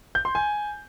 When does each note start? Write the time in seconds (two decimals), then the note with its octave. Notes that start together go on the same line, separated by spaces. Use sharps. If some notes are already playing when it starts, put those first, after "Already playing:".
0.15 G6
0.25 C6
0.35 G#5